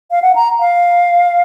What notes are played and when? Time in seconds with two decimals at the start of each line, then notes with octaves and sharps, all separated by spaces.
0.11 F5
0.22 F#5
0.35 A#5
0.60 F5